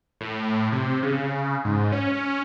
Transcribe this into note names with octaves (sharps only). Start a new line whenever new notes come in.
A2
C3
C#3
G#2
C#4